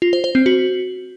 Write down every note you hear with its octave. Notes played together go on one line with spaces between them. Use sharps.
F4
C5
C5
C4
F#4